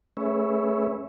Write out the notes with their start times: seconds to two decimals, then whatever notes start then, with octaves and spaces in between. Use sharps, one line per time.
0.17 A3 C#4 G#4 B4 C#5 E5